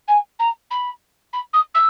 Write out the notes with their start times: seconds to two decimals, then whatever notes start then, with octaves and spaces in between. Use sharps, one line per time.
0.08 G#5
0.39 A#5
0.70 B5
1.33 B5
1.53 D#6
1.74 E6